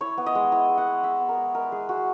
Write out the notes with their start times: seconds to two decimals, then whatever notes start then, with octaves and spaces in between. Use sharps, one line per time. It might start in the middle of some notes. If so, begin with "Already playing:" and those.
0.01 E4 C#5
0.18 B3
0.26 D#5
0.35 G#3
0.52 E4 D#5
0.69 G#3
0.78 F#5
0.86 B3
1.03 G#3 E5
1.20 B3
1.29 A#4
1.38 G#3
1.55 G#3 A#4
1.72 G#3 G#4
1.89 G#3 F#4